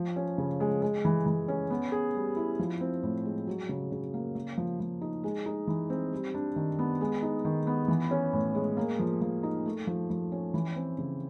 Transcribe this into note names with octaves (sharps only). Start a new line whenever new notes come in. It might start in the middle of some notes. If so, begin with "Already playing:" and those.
Already playing: F3
C#4
C#3
G#3
G#3
E3
E3
C#4
B3
G#4
G3
E4
F3
C4
A2
G#3
F#3
C#3
C#3
A#3
A#3
F3
F3
D#4
G#3
D#4
E3
C4
G3
D4
D#3
B3
G#3
D#4
D#3
B3
E3
C#4
A2
G#3
A#3
F3
F3
D#4
A3
F3
F3
C#4
E3
C4
C#3